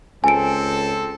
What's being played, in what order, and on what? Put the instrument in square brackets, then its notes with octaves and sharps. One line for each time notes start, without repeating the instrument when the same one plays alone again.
[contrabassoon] C#2 [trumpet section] C4 A4 [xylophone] G#5 D7